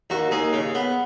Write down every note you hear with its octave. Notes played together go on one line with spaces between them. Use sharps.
D#2 F#4
D#2 G#4
C#3
B3